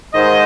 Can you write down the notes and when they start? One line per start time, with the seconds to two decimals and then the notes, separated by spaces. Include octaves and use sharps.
0.14 G#2 D#3 C5 D#5